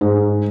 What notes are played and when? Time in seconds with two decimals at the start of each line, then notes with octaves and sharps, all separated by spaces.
0.01 G#2